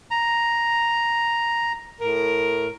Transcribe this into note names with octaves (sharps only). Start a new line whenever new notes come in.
A#5
A2 A#4